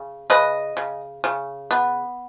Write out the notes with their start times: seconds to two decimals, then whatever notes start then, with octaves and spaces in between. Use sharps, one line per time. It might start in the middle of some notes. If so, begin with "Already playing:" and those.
Already playing: C#3
0.30 C#3 B4 D#5
0.77 C#3
1.24 C#3
1.71 B3